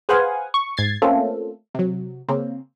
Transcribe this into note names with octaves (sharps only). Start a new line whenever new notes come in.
G#4 B4 C5 F5 F#5 G#5
C#6
G#2 G#6 A6 C7
A3 A#3 C4 C#4 F4 A4
C3 F#3
C#3 A#3 C4